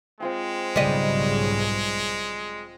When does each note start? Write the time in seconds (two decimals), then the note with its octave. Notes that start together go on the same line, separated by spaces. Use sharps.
0.20 G#3 C4 F4 G5
0.76 B1 G#2 C#3 G3 D5 D#5